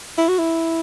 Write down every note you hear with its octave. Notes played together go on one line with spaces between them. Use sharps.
E4
F#4
E4